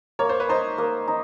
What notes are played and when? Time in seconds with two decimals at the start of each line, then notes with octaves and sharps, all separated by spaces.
0.19 A#3 C#5
0.29 C5
0.40 B4
0.49 D#4 C5
0.78 A#3
1.08 D#4